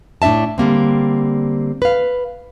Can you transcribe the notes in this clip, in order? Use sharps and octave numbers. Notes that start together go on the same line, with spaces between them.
A2 D4 D#4 E5 A5
D3 G3 A#3 C4
B4 F5